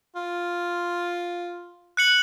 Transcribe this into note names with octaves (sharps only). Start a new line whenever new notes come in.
F4
F#6 C#7 F#7